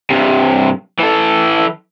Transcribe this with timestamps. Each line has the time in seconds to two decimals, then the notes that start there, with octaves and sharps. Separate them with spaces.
0.10 G2 C3
1.00 E3 A4